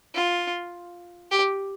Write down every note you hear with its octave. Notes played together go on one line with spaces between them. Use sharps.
F4
G4